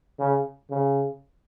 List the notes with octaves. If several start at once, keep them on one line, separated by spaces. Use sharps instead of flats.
C#3
C#3